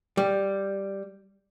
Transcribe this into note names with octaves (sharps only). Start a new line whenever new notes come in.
G3